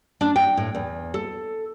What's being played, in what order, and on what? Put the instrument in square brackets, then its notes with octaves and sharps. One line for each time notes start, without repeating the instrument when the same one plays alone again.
[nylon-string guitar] D4
G5
A2
E2
A4